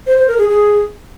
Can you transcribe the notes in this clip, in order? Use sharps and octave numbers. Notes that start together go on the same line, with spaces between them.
C5
C5
A#4
G#4
G#4